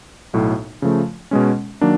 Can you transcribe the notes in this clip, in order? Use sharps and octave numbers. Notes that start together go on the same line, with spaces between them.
B1 A2 F#3
C#3 F3 A3
B2 G#3 C#4
D#3 F#3 A#3 D4